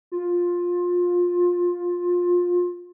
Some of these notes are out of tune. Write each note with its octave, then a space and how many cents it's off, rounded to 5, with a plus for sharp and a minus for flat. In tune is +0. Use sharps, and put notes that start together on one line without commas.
F4 +20